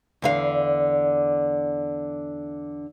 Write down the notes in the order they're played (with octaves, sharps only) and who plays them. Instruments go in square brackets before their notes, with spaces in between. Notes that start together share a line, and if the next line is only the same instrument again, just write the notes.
[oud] E2 D3 F5